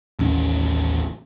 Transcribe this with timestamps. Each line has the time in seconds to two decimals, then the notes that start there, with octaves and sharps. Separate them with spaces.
0.19 A1 D#2 C#4